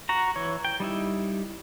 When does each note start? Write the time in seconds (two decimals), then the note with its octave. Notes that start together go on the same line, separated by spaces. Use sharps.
0.09 F#4 A#5
0.36 E3 C#5
0.65 G5
0.80 G3 D#4 E4